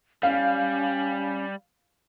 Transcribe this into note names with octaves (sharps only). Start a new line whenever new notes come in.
G3 C#4 F5